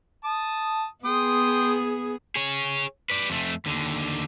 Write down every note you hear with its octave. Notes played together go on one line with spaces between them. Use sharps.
A5 D#6
B3 G#4 G5 C6 D#6
G#4 C#5
B4 D5
F2 A3
D#2 D3